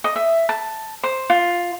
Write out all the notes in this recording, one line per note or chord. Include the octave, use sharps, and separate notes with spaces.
D#5
E5
A5
C5
F4